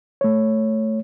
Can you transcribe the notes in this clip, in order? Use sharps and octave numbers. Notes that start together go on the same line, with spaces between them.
A3 C#5